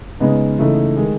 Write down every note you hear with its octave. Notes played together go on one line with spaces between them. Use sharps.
C#3 G#3 B3 D#4
C#3 E3 A3 D#4
D#3 G#3